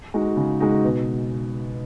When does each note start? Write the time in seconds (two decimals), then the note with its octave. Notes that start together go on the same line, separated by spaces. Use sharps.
0.14 G#3 D#4 F#4
0.37 C#3
0.60 G#3 D#4 F#4
0.84 B2